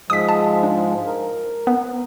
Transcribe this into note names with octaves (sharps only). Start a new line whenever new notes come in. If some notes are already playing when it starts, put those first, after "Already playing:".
G#2 F3 G#3 D#6 B6
A5
D4
A#4
B3